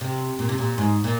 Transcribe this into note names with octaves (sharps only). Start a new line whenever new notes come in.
C3
A#2
C3
A#2
G#2
A#2